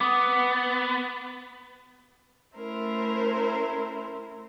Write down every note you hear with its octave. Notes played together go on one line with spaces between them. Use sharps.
B3 D6 D#6
A3 C#4 E4 A#4 C5